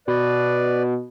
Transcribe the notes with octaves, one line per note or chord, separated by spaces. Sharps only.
B2 B4 D5